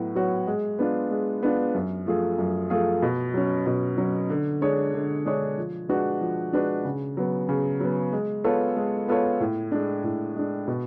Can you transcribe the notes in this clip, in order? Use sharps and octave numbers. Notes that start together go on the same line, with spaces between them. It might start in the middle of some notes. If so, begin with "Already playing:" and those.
Already playing: A2 F#3 B3 F#4
F#3 B3 F#4 C#5
G#3
B3 D4 F4
G#3
B3 D4 F4
F#2
F3 A3 F4 G#4
F#2
F3 A3 F4 G#4
B2
F#3 C#4
B2
F#3 C#4
D3
G#3 D4 G#4 C#5
D3
G#3 D4 G#4 C#5
F3
G#3 D4 F#4 B4
F3
G#3 D4 F#4 B4
C#3
F#3 B3
C#3
F#3 B3
G#3
B3 F4 A4 C#5
G#3
B3 F4 A4 C#5
A2
G#3 D4
A2
G#3 D4
B2